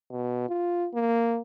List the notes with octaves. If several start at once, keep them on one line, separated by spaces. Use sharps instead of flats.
B2
F4
A#3